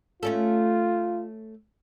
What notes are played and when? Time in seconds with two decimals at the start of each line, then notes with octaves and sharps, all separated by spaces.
0.23 A3 C#4 F4 A4